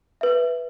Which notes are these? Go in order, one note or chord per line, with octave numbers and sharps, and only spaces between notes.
B4 E5